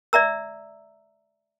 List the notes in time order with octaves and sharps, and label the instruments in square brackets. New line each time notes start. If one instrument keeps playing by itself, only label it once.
[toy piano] D5 E5 A#5 E6